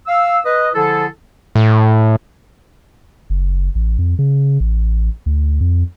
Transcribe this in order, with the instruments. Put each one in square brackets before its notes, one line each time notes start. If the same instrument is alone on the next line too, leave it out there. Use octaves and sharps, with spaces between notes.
[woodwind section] F5 E6
B4 D#5
D3 F3 E4 G#4 A4
[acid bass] A2
[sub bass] F#1
A1
F2
C#3
A1
D2
F2